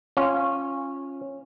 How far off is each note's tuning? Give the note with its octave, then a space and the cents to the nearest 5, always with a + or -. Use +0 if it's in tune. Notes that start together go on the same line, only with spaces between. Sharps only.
C#4 -15 F4 +0